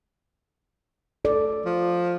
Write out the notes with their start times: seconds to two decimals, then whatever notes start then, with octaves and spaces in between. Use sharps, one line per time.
1.25 A4 D5
1.66 F3